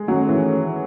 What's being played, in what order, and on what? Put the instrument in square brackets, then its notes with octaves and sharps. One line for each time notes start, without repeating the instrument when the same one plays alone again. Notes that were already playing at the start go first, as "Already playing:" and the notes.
Already playing: [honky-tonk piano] G#3
[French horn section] D#3 A3 C#4 [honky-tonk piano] F#3
[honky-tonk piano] E3